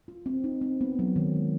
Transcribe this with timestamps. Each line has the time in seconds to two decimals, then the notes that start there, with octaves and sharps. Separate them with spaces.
0.08 F4
0.26 C4
0.44 D#4
0.61 C4
0.81 B3
0.99 F#3
1.16 D#3
1.35 G#3